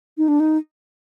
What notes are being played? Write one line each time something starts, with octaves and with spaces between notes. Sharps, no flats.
D#4
D4
D#4